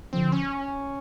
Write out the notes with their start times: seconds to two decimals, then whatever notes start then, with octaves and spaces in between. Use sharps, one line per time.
0.13 D3 F3 C4
0.32 C#4